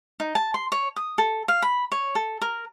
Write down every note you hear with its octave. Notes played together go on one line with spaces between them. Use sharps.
D#4
A5
C6
C#5
D#6
A4
F5
B5
C#5
A4
A#4